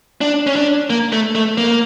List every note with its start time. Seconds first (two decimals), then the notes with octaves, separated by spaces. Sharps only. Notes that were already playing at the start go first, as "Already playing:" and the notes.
0.21 D4
0.47 C#4
0.56 D4
0.90 A#3
1.12 A3
1.35 A3
1.58 A#3